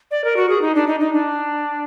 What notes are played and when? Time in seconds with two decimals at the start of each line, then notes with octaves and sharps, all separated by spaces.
0.11 D5
0.24 A#4
0.36 F#4
0.49 G#4
0.62 D#4
0.75 D4
0.88 D#4
1.00 D#4
1.13 D4